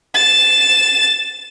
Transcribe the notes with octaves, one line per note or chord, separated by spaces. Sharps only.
A6 E7